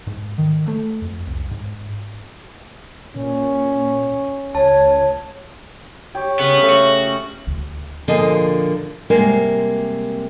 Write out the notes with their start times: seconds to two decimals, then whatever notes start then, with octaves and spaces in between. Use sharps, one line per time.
0.07 G#2
0.38 D#3
0.68 A3
1.02 F2
1.27 C2
1.51 G#2
3.16 A#2 C#4
4.55 C#2 C#5 A5
6.15 G4 C#5
6.39 C#3 B3 C#6
6.58 C#3 A3
6.70 F#4
7.47 D2
8.08 A#2 D3 F3 A#3 G#4 D#5
9.10 C3 G3 G#3 A#3 A#4